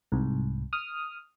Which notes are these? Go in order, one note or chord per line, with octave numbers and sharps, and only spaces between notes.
C2 G#2
D#6 F6